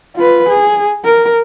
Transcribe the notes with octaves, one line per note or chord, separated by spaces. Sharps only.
F4 B4
G#4
A#4